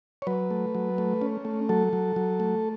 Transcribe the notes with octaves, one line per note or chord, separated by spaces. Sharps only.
C#5
F#3 B4
A3
F#3
A3
C#4
A3
F#3 A4
F#3
F#3
A3